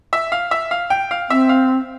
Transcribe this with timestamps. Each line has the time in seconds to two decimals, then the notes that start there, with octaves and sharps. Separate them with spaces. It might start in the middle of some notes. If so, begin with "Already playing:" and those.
0.13 E5
0.32 F5
0.51 E5
0.71 F5
0.90 G5
1.11 F5
1.30 C4 E5
1.49 F5